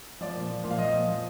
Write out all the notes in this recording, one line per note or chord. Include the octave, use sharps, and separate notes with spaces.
F3 D5
A#2
F3
A#2
F5
F3 D#5
A#2
F3